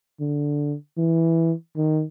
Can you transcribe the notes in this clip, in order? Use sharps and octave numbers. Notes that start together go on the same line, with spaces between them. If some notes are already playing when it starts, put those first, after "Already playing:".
D3
E3
D#3